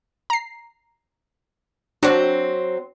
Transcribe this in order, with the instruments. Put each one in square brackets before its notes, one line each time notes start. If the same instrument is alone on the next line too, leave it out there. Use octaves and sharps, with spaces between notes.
[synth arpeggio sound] A#5 C7
[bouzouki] F#3 C4 [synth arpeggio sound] D4 F#4